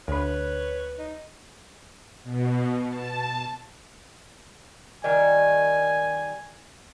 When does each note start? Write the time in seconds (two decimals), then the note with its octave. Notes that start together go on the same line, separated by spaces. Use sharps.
0.08 D2 B4 C#5 B5
0.99 D#4
2.24 B2
2.89 A5
5.04 D#3 G3 G#5